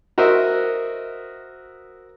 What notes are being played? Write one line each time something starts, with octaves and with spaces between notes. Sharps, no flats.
F#4 A#4 C5 D#5 E5